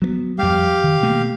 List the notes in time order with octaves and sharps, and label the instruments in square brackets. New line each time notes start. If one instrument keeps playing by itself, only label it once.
[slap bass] F#3 A#3 B3
[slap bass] F2 G3 [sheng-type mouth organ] G4 F5
[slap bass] D#3
B2 A3 A#3